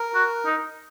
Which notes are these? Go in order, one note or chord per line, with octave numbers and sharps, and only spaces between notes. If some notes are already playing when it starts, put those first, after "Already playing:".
Already playing: A#4
F#4
D#4